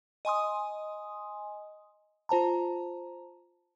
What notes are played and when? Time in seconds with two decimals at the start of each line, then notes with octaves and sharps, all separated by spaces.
0.25 D#5 G#5 C6 D#6
2.29 F4 C5 A5 A#5